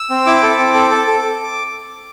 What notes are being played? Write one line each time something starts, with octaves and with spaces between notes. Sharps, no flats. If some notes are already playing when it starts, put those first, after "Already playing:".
Already playing: E6
C4
E4 D6
A4
C4
A4
A4
A4